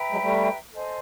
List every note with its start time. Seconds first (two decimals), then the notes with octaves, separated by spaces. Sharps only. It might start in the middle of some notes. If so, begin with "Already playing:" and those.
Already playing: B4 E5 G5 A#5
0.12 F#3 G#3
0.22 G3 A3
0.71 A4 C5 D#5 G#5